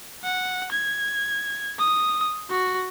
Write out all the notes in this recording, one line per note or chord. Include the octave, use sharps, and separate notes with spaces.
F#5
G#6
D#6
F#4